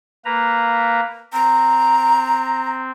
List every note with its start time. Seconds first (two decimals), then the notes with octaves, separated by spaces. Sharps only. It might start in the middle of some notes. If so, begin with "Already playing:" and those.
0.25 A#3 B4 A#5
1.33 C4 A#5